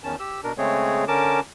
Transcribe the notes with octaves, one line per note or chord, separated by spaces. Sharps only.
E2 D#3 C#4 A5
G4 E6
B2 D4 A#4
C#3 G#3 A3 C4 G#4 C#5
D3 C#4 A#4 A5 D6